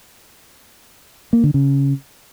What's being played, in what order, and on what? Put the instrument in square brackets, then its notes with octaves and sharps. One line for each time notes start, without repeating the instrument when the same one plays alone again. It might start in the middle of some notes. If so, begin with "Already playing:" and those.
[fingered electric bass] A#3
D3
C#3